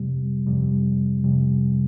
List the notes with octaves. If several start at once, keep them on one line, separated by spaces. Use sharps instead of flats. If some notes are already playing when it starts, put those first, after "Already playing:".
Already playing: F2 C3 G3
F2 C3 G3
F2 C3 G3